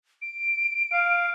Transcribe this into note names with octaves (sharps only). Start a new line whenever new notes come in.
D7
F5